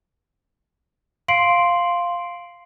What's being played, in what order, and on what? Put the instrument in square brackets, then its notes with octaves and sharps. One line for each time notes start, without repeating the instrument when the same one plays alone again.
[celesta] F5 C6 C7 D7 F#7